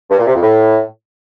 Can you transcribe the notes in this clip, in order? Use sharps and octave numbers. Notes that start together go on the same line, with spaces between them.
G2
A#2
C3
F2
A2